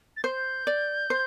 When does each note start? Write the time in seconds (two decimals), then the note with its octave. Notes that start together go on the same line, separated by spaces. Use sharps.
0.17 A6
0.24 C5 G6
0.67 D5
1.10 C5